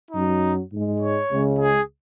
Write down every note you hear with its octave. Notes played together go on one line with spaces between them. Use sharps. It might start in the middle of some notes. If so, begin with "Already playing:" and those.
F#2 F#3 D#4
G#2 G#3
C#5
C#2 C#3 G#3
G#4